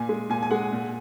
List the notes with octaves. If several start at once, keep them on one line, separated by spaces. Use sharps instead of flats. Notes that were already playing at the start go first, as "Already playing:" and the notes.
Already playing: A#2 G#5
G#3
A#2 G#5
G#5
G#3 F#5
A#2